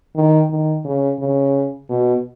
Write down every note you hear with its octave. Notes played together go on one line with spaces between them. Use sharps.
D#3
D#3
C#3
C#3
B2